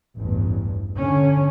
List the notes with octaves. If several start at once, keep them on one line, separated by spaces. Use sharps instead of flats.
A1 E2 G2
D3 C#4